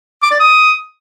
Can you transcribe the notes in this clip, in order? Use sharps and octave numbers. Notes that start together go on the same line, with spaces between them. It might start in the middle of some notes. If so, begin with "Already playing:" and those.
D6
D5
D#6